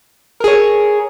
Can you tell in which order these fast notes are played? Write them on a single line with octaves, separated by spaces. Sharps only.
A#4 G#4 C#5